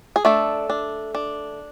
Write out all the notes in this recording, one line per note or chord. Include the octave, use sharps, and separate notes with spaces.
G#4
A3 D4 A4
D4
D4